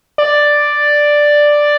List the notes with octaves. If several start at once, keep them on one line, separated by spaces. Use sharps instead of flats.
D5